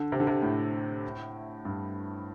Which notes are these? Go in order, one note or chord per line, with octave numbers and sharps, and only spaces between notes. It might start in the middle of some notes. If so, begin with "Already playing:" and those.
Already playing: D3
C3
D3
C3
A2
G2